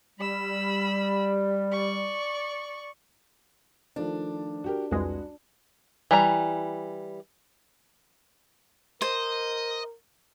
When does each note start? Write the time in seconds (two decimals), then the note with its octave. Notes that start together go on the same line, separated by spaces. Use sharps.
0.19 G3 B5 E6
1.72 D5 C#6
3.96 D#3 F3 A3 D4
4.64 F#4 G4 A#4
4.91 C2 F2 G#3 F#4 B4
6.11 E3 G3 A#5
9.02 A#4 C5 D#5